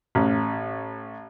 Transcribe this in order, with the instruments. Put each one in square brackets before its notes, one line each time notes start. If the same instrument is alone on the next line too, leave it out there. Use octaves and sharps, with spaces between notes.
[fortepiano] A1